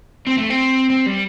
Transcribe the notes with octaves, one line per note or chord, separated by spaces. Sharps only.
C4
A3
C4
C4
G3